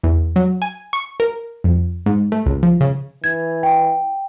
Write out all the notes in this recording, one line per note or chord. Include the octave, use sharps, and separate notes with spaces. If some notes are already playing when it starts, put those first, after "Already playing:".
E2
F#3
G#5
C#6
A#4
F2
G#2
A3
C#2
F3
C#3
E3 G#6
G5